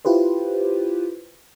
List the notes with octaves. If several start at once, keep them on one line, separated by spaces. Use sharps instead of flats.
E4 F4 G4 B4 C5